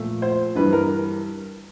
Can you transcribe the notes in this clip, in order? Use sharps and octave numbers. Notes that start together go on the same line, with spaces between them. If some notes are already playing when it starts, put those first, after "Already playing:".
Already playing: A#2 F3 A3
C5
G2 E3 G3 B4
A#4